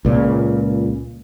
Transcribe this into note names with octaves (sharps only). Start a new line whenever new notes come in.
C#2 A#2 C#3